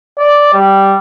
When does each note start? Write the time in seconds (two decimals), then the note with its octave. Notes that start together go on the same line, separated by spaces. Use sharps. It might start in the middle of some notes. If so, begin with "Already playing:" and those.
0.18 D5
0.54 G3